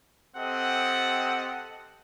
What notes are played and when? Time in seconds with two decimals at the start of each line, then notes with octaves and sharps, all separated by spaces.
0.36 C4 G4 A4 D#5 F#5